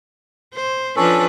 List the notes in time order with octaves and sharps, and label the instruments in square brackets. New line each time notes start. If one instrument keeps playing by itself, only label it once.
[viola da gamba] C5
[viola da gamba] F3 D4 B4 [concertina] C#4 A4